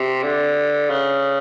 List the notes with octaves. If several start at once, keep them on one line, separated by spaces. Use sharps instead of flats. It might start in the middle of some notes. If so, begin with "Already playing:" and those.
Already playing: C3
D3
C#3